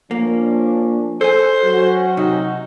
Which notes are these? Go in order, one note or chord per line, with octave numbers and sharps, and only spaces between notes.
F3 A#3 C#4 D4
A4 C5 G#5
F#3 C#4 F#4
C3 D#4